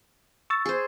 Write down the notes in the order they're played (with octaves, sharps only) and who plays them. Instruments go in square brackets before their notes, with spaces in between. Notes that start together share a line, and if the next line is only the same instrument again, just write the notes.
[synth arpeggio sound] C#6 E6 A6
[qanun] G#4 C5